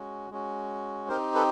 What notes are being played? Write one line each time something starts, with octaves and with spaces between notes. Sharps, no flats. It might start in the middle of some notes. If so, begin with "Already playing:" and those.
Already playing: G#3 C#4 F#4
G#3 C#4 F#4
C4 D#4 G4 A#4 C5
A4 B4